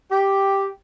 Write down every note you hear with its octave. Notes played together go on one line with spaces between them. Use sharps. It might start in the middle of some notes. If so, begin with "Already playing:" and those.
G4